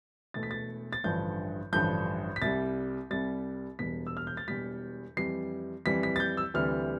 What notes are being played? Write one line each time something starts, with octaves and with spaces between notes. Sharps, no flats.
E1 E2 B2 A3 A6
B6
A6
A6
A1 G2 D3 F3 G6
A1 G2 D3 F3 G6
B6
C2 C3 G3 A6
C2 C3 G3 A6
E1 E2 B2 G3 B6
E6
F6
G6
A6
E1 E2 B2 G3 B6
F2 E3 G3 C7
F2 E3 G3 B6
B6
A6
G6
E6
D2 C3 E3 G3 F6